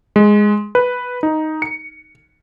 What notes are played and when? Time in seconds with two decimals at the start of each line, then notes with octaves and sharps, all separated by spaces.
0.16 G#3
0.75 B4
1.23 D#4
1.62 C#7